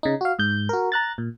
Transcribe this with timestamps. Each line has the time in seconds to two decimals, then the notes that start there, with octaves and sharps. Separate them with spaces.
0.03 C#3 D#4
0.21 F#4 F5
0.39 G#2 G6
0.69 F#4 A#4
0.92 A#5 F#6 A6
1.18 A#2